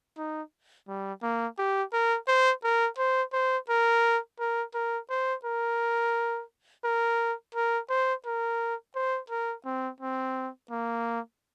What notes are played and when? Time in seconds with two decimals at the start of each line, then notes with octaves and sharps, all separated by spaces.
0.18 D#4
0.88 G3
1.23 A#3
1.59 G4
1.93 A#4
2.28 C5
2.64 A#4
2.98 C5
3.33 C5
3.69 A#4
4.39 A#4
4.74 A#4
5.10 C5
5.45 A#4
6.84 A#4
7.55 A#4
7.90 C5
8.26 A#4
8.95 C5
9.30 A#4
9.65 C4
10.00 C4
10.71 A#3